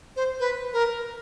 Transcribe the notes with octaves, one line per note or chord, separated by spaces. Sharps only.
C5
B4
A#4